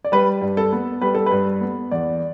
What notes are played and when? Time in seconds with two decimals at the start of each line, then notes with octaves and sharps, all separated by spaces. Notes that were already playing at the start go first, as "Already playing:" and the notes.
0.05 D5
0.12 G3 B4
0.41 G2
0.57 A4
0.72 B3
1.01 G3 B4
1.15 A4
1.26 B4
1.31 G2
1.61 B3
1.91 E2 D5